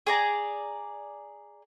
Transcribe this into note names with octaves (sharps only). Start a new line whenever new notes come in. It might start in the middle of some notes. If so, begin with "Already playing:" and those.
G#4 D5 A#5